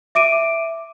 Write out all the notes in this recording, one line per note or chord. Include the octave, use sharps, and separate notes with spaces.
E5 D6 D7 D#7